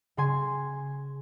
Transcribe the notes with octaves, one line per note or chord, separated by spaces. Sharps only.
C#3 G#5 C6